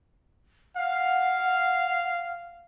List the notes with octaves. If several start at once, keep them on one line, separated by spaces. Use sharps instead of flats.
F5 F#5